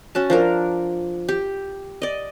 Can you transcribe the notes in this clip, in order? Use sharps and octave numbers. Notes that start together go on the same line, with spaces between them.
C#4 F#4 A5
F3 D4 A#4
G4
D5 D#5